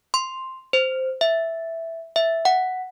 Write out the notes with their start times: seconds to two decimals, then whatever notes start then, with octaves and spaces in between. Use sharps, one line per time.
0.14 C6
0.73 C5
1.21 E5
2.16 E5
2.45 F#5